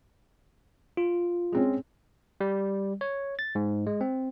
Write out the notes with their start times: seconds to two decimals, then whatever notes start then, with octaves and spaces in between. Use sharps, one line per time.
0.97 F4
1.52 G#3 C4 C#4
2.41 G3
3.01 C#5
3.39 A6
3.55 G#2
3.87 G#3
4.01 C4